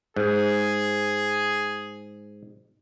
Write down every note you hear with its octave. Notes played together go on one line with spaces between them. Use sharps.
G#2 G#4